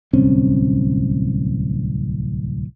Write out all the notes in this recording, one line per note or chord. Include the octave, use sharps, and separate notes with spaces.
D1 C2 C4 C#4